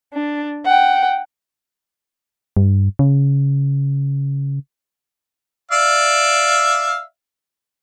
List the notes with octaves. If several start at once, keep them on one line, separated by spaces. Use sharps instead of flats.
D4
F#5 G5
G2
C#3
D5 E5 F5